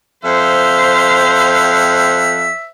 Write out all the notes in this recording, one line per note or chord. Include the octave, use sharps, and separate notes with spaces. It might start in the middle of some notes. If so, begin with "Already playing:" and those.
F2 C5 E5 F5